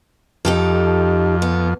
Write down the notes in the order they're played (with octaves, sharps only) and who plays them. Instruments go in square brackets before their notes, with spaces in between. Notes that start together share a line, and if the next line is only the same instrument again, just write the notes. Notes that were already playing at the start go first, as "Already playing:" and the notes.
[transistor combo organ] F2 [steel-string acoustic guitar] D#4 G4 A4
[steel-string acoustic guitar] B3